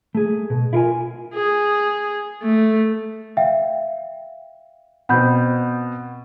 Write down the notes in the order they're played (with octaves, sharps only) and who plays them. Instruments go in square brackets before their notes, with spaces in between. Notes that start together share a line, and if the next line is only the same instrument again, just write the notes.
[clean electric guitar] A3 G#4
B2
E4 F4 A#4 G#5
[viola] G#4
A3
[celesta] E5 F5 G5
[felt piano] B2 C4 [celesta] F#5 B5 G6